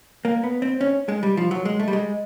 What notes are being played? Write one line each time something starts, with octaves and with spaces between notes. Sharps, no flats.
A#3
B3
C4
C#4
G#3
G3
F3
F#3
G#3
A3
G3
G#3